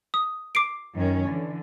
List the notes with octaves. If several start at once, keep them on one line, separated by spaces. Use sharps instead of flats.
D#6
D6 C7 D7
F#2 D#3 C#4
D3 E3